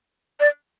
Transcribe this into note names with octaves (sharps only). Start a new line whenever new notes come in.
D5